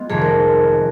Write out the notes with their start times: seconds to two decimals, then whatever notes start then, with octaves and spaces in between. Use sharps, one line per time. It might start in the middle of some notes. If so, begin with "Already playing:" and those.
Already playing: G#3 B3 F4
0.09 F1 F2 D#3 G#4
0.22 A#4